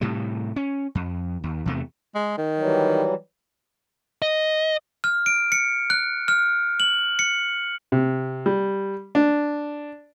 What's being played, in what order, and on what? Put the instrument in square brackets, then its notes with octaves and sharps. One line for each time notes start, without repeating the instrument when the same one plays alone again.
[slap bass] A2 C3 G3
C#4
F2
D#2
E2 C3 A3
[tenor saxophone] G#3
D#3
[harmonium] E3 F#3 G3
[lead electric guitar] D#5
[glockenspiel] F6
D7
C#7
F#6
F6
F#7
C#7
[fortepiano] C3
G3
D4